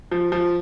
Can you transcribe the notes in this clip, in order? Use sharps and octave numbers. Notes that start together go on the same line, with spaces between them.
F3
F3